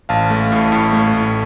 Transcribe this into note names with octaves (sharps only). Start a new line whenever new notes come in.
A1 F5 A5
A3
A2
A2
A3
A2